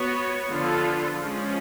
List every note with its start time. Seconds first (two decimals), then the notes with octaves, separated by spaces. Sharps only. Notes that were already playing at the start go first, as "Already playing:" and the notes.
Already playing: B3 F#4 C#5
0.50 D3 F3 B3 F4 A4
1.19 F3 G#3 C#4